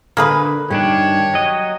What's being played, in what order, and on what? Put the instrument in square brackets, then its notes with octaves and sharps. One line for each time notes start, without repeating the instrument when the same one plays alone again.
[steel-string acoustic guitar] D3 [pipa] A#3 G#4 B4
[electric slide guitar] G2 D#3 D4 [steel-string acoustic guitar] G4 [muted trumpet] C#5
[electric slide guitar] F#3 D#5